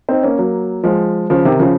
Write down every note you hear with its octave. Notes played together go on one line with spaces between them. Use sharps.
C4 D#4
A#3 C#4
F#3 A#3
F3 G#3
C#3 F3
C3 D#3
C#3 F3